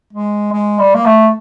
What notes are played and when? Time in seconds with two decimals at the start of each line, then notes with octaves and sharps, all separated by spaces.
0.13 G#3
0.53 G#3
0.79 G3
0.95 A#3
1.05 A3